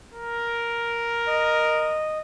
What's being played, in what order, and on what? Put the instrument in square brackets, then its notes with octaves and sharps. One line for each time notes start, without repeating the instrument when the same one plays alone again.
[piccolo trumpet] A#4
[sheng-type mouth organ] D#5